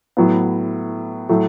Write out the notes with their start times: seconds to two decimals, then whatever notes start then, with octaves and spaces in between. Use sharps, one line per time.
0.17 A2 F#3 B3
1.29 A2 F#3 A3